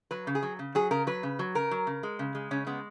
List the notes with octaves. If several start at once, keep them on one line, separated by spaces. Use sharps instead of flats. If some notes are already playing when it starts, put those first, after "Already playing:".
F#3 B4
C#3
G#4
F#3
C#3
F#3 G#4
C#3 A#4
F#3 B4
C#3
F#3
C#3 A#4
F#3
C#3
G#3
C#3
G#3
C#3 C#4
G#3 B3